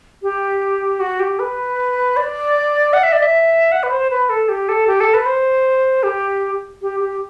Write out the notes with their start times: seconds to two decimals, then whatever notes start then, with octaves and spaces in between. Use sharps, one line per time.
0.23 G4
1.00 F#4
1.20 G4
1.39 B4
2.17 D5
2.93 F#5
3.03 E5
3.12 D5
3.22 E5
3.72 F#5
3.83 B4
3.91 C5
4.10 B4
4.29 A4
4.49 G4
4.69 A4
4.87 G4
5.00 A4
5.14 B4
5.26 C5
6.03 G4
6.82 G4
7.00 G4